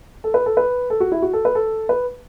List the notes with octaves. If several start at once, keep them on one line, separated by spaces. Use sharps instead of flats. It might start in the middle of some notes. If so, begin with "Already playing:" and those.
A4
B4
A4
B4
A4
F#4
E4
F#4
A4
B4
A4
B4